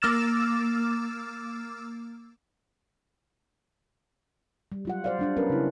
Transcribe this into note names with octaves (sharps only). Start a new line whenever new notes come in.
A#3 D6 E6 F6 A6 E7
G3
F#3 F4 F#5
C5 D5 F5
G3 D4 F5
F#3 B3 C#4 A#4 B4
C#3 E4